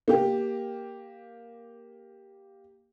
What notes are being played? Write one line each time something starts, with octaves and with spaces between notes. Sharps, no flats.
A#3 G4